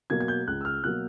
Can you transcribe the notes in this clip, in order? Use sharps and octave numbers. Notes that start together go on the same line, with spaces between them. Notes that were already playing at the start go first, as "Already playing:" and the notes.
B2 F#3 A#3 G#6
G#6
G6
C#2 F#6
E6
F6
B2 F#3 A#3 F#6